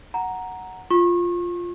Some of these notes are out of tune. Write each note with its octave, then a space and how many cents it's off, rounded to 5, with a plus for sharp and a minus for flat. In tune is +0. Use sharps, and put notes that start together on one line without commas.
F#5 +0 A#5 +0
F4 +0 C#6 -35